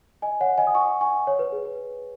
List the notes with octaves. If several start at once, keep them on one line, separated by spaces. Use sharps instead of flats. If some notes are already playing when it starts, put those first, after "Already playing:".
D#5 G#5
C#5 F#5
D#5 G#5
D#6
G#5 C#6
G#5 C#6
C#5
B4
G#4
B4